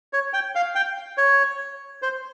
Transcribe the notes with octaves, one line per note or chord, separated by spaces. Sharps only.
C#5
G5
F5
G5
C#5
C5